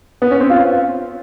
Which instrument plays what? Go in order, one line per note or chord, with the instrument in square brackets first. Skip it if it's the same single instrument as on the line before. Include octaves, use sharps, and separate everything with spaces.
[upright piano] B3
C#4
C4
F4